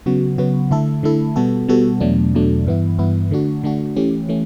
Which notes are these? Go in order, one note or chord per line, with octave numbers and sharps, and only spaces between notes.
C#3 F#3 B3 F#4
C#3 F#3 B3 F#4
D3 A3 E4 A4
D3 A3 E4 A4
B2 G3 B3 F#4 A4
B2 G3 B3 F#4 A4
E2 B2 F#3 A3 D4
E2 B2 F#3 A3 D4
G2 E3 B3 E4
G2 E3 B3 E4
D3 A3 D4 F#4
D3 A3 D4 F#4
E3 A3 C#4 G4
E3 A3 C#4